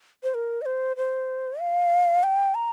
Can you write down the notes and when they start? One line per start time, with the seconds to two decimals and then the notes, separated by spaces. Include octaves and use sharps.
0.23 C5
0.34 A#4
0.62 D#5
0.66 C5
0.97 C5
1.60 F5
2.23 G5
2.55 A#5